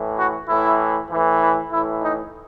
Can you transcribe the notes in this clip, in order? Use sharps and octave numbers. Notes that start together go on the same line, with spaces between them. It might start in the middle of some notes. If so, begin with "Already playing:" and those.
Already playing: A2 E3
F#4
A2 E3 E4
A2 E3
E4
A2 E3 E4
D#4